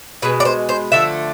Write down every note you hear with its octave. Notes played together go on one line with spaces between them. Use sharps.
B2 G#3 B4
D5
C5
C5
D3 F3 A3 E5